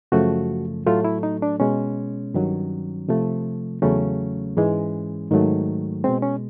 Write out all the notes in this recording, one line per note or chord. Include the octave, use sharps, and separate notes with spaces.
F#2 C#3 F3 A3 F#4
A2 F#3 A3 F4
E4
D#4
D4
B2 G#3 C#4
G2 D#3 F#3
C3 F3 A3
E2 C#3 F#3 A3 C#4
G#2 E3 G#3
G#2 D#3 F#3 A3
B2 G#3 C4
C#4